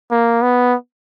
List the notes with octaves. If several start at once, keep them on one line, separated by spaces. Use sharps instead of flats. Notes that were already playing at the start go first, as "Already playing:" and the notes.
A#3
B3